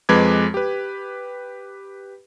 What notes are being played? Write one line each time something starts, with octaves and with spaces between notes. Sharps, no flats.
F2 G#3 B4 D6 G#6
G4 B4